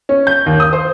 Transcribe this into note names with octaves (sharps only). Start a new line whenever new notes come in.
C#4
G6
D#2
D#6
C5